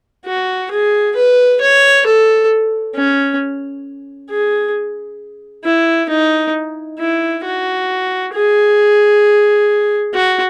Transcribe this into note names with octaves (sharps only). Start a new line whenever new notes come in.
F#4
G#4
B4
C#5
A4
C#4
G#4
E4
D#4
E4
F#4
G#4
F#4